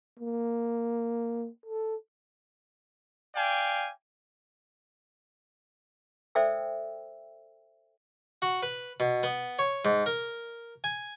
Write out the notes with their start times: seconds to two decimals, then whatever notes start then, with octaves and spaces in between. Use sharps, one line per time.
0.19 A#3
1.66 A4
3.35 D5 F5 G5 G#5
6.35 A4 C5 D5 E5 G5 E6
8.42 F#4
8.63 B4
9.00 B2
9.23 B3
9.59 C#5
9.85 G#2
10.06 A#4
10.84 G#5